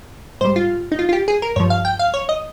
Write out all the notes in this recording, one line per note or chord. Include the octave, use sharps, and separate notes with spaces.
G#2 G3 C5
F4
D#4
F4
F4
G4
G#4
A#4
G2 F3 C#5
F5
G5
F5
C#5
D#5